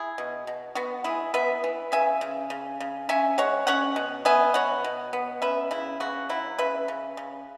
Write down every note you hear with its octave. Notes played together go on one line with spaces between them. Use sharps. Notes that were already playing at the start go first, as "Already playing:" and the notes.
Already playing: E4 G#4
B2
B2
B3 F#4
E3 E4 G#4
B3 B4 E5
E3
C#3 E5 G#5
C#3
C#3
C#3
C#4 E5 G#5
G#3 C#5 F#5
C#4 C#5 F#5
B2
B3 E5 G#5
B2 C#5 F#5
B2
B3
C#4 B4 E5
C#3 E4
C#3 F#4
F#3 E4
C#3 B4 E5
C#3
C#3